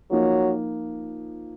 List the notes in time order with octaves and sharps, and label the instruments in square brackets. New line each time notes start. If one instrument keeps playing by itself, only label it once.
[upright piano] F3 A#3 D#4 [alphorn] F#3